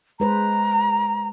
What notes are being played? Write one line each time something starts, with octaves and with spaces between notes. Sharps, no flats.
G#3 B4 C5 A#5